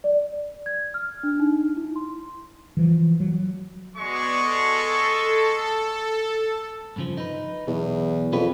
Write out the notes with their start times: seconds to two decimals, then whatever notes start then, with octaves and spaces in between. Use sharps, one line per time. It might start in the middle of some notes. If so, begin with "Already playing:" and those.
0.04 D5
0.66 G#6
0.94 F6
1.23 D4
1.40 D#4
1.77 E4
1.96 C6
2.77 E3 F3
3.20 F#3
3.97 G#3 B3 F#4 D5 C#6
4.34 A4
6.96 G2 C#3 F3
7.17 D#4 B4
7.67 B1 E2
8.33 F2 C#4 B4